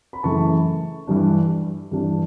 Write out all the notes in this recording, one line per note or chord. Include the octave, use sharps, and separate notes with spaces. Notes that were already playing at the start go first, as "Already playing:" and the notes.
B5
F#2 C#3 E3 A3 A5 C#6
G2 E3 G3 D4
G2 E3 G3 D4